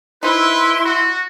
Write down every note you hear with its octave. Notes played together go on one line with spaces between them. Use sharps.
D#4 E4 B4 C5 C6
F#4